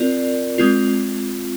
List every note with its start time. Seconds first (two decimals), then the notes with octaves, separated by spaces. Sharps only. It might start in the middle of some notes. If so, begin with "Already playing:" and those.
Already playing: C4 F4 A#4 D5
0.58 G#3 C4 F4